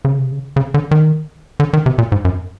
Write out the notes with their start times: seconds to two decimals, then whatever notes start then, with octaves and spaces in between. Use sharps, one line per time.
0.05 C#3
0.19 C3
0.32 C#3
0.56 C#3
0.74 D3
0.91 D#3
1.60 D3
1.73 D#3
1.86 C3
1.98 A#2
2.12 G#2
2.25 F#2